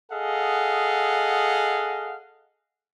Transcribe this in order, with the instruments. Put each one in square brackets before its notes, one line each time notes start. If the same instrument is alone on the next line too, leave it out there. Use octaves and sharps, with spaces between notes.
[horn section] G#4 A4 D#5 F5 F#5